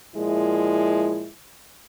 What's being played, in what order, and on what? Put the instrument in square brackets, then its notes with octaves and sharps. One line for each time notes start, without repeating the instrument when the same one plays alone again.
[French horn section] A#2 F3 G#3 E4